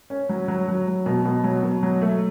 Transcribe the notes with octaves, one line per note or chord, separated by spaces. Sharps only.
C#4
F#3
F#3
F#3
F#3
B2
B2
F#3
B2
F#3
A3